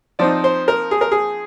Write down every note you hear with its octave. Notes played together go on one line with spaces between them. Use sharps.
F3 C4 D#4 D5
C5
A#4
G#4
A#4
G#4